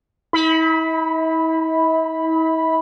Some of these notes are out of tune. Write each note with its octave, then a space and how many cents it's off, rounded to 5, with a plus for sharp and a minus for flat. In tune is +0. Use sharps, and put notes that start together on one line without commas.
E4 -45 B5 +0